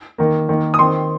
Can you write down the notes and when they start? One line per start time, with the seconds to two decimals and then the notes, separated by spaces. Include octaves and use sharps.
0.18 D#3 A#3
0.49 D#3 A#3
0.74 D#6
0.79 D#3 C4 C6